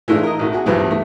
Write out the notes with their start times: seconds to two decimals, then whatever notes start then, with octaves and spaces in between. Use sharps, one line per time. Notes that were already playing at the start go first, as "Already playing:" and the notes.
0.08 E3 G#3 A3 D4 F4
0.23 A#4 D#5
0.39 A1 B2 A3
0.53 F#4 G#4
0.66 B1 E2 G2 F3 B4
0.91 A3